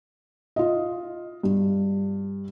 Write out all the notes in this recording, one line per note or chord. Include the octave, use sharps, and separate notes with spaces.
F4 D#5
G2